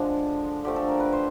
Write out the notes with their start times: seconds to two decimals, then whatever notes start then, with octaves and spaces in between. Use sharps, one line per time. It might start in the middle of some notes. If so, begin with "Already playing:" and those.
Already playing: D3 F3 G#3 D4
0.64 D3 F3 A3 G4
0.76 A4
0.88 A#4
1.00 B4
1.12 C5